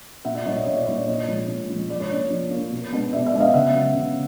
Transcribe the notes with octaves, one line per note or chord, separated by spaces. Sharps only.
A#2 E5 F#5
D5 E5
G3 A#3 D#4 C#5 D#5
D5 E5
A#2 C#5 D#5
D5
G3 A#3 D#4 C#5
D5
A#2 C#5 D#5
F3 G#3
A#2
F3 G#3
F3 D5
C#5
A#3 D4 D5
F3
A#3 D4
B2
G#3 B3 D4
B2 D5 E5
D5 E5
G#3 B3 D4
D#5 F5
C#3 E5 F#5
F#3 B3
C#3